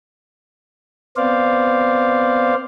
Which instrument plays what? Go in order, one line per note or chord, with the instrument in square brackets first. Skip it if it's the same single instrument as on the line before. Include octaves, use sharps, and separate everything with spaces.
[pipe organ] B3 C4 C5 D5 F5